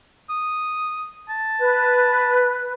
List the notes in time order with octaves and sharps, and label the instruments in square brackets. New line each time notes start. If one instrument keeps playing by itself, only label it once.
[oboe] D#6
A5
[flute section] B4